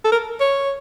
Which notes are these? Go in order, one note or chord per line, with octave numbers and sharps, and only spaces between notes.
A4
A#4
C#5